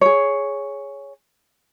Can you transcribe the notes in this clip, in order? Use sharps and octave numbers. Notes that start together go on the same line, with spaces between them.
G#4 C#5